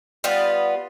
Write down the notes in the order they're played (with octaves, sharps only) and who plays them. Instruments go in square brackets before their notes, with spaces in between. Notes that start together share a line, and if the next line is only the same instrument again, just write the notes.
[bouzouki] G3 B3 F4